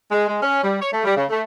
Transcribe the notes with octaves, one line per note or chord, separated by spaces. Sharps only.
G#3
G#3
C#4
G3
C#5
A3
G3
C#3
A3